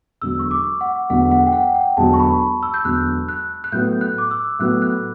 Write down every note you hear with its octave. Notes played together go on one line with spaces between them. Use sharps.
E1 E2 D3 F#3 E6
C#6
D6
F#5
E1 E2 D3 F#3 F#5
F#5
G5
F#5
G5
E1 E2 D3 F#3 A5
C#6
B5
E6
G6
E1 E2 D3 F#3 F#6
F#6
F#6
A2 F#3 B3 G6
F#6
D6
E6
A2 F#3 B3 F#6
F#6